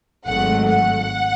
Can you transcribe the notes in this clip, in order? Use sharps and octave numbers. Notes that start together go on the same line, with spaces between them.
G#1 G#2 F#3 A3 F#5
F#5